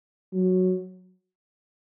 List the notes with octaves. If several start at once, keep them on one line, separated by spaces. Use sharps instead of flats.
F#3